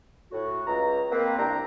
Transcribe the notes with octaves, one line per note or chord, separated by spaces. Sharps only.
A2 F#4
C#2 A#5
A#3 C4 B4
C2 D4 G5 A#5